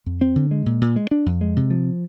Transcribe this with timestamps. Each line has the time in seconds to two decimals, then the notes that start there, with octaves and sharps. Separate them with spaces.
0.06 F2
0.21 C4
0.36 D3
0.51 G#3
0.66 A#2
0.81 A#2
0.96 G#3
1.11 D4
1.26 F2
1.41 G#3
1.56 C3
1.70 F3